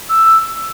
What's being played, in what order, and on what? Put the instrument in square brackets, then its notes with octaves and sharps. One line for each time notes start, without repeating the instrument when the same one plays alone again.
[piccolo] E6